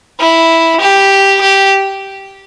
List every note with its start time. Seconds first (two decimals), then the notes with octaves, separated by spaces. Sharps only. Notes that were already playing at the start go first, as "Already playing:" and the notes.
0.20 E4
0.81 G4
1.41 G4